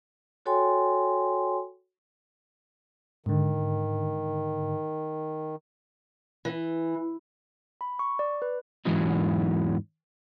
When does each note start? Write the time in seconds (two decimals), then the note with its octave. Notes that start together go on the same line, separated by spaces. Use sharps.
0.46 F#4 A4 C#5 G5 G#5 C6
3.26 G#2 D3 D#3
6.45 E3
7.81 B5
7.99 C#6
8.19 D5
8.42 B4
8.85 E2 G#2 E3 F#3 C#4 D#4